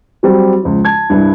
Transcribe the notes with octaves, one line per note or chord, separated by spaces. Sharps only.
F#3 G3 C4
C#2 F3
A5 G#6
C2 G2